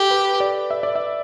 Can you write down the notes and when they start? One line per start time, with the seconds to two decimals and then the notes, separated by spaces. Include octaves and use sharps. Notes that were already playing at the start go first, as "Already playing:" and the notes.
Already playing: G4 A4
0.11 B4
0.40 D5
0.71 E5
0.83 D5
0.95 E5